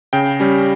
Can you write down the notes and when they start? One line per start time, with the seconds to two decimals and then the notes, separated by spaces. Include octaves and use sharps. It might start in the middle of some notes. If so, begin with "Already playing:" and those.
0.13 C#3 G5
0.40 G3 C#4